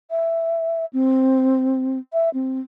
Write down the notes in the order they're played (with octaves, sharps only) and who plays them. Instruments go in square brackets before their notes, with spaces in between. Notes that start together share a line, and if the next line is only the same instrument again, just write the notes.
[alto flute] E5
C4
E5
C4